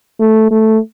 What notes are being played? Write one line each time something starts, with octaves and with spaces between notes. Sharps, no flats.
A3
A3